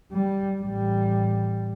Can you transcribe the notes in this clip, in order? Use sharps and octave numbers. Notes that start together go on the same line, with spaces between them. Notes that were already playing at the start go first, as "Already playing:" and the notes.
G3
A1 G3